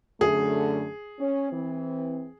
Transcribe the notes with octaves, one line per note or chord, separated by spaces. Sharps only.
F#2 D3 A3 G#4
C#4
E3 C4